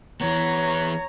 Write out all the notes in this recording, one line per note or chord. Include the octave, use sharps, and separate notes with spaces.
E3 B3 C#5 A#5